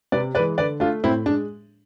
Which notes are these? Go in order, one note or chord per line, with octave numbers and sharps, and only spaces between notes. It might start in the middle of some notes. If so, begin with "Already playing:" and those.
C3 B4 D5
E3 G#3 B4 D5
D3 B4 D5
A3 D4 F4
A2 C4 E4
G#3 D4